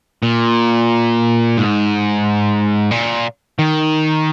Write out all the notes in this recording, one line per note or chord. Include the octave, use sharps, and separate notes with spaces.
A#2
G#2
A#2
D#3